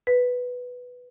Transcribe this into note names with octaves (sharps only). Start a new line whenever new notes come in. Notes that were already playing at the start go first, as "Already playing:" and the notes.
B4